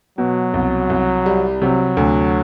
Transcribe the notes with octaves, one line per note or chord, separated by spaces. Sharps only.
B2 F#3
C2
C2
G3
C3 F#3
D2